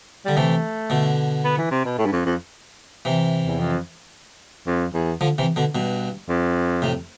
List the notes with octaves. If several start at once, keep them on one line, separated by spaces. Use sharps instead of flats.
D3 G3
C3 E3 A3
B2 D3
B3
E3
C3
B2
A2
G2
F2
F2
C3 E3
E2
F2
F2
E2
D3 F3
C3 E3
B2 D3
G2 B2
F2
A2 C3